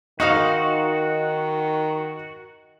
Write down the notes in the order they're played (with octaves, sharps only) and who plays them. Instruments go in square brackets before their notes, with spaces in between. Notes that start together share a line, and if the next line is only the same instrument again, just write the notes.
[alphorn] D#3 [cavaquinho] D#4 C5 F5 [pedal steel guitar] F#4 [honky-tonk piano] D#5 F#5 D#6